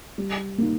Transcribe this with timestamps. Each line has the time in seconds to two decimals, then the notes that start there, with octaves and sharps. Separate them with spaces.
0.18 G3
0.58 A#3 D#4